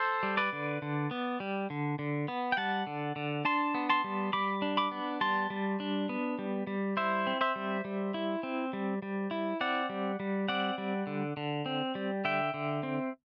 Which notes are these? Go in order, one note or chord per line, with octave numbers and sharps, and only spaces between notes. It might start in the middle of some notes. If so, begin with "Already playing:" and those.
Already playing: A4 C5
G3
B4 D5
D3
D3
B3
G3
D3
D3
B3
G5
G3 F#5 A5
D3
D3
D4 A5 C6
B3
A5 C6
G3
G3 B5 D6
D4
B5 D6
B3
G3 A5 C6
G3
D4
B3
G3
G3
E4 C5 E5
C4
C5 E5
G3
G3
E4
C4
G3
G3
E4
C4 D5 F#5
G3
G3
C4 D5 F#5
G3
D3
D3
C4
G3
D3 E5 G5
D3
C4